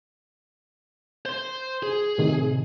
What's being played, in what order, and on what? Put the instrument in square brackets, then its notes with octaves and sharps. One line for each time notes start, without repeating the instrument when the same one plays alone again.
[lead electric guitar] C5 C6
G#4
[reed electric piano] A2 C3 D#3